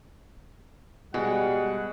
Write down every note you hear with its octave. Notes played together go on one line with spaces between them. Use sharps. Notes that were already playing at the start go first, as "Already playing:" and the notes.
B2 G3 G#3 F#5